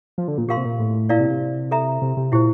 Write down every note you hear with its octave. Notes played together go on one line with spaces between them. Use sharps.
F3
D3
A#2
A#2 G4 A#4 F5 C6
C3
A#2
A2
A#2 E4 A#4 D5 F5
C3
C3
A4 E5 A#5
C3
C3
A#2 E4 G4 C5